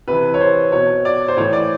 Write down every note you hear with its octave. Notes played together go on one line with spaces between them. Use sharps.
C3 B4
E3
C#5
C5
B2 C#5
D5
C5
A2 E3 C#5
D5